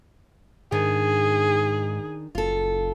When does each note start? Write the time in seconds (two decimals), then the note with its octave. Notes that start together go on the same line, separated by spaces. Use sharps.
0.72 G#2 D#3 D4 G#4
2.35 F#1 F4 A4